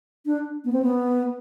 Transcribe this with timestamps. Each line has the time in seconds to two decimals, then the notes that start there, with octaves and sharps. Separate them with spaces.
0.26 D4
0.65 B3
0.72 C4
0.83 B3